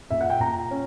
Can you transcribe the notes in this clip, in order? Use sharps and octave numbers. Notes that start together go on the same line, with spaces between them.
A#2 E5
F#5
G5
A#2 A#5
C#4